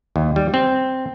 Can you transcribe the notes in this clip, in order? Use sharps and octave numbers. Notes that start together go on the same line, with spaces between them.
D#2
G3
C4